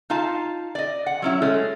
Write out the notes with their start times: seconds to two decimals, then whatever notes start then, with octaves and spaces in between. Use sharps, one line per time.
0.10 D#4 F4 F5 A5
0.75 D5 D#5
1.07 F#5
1.22 F#3 C#4 E4
1.42 G#3 A3 C#4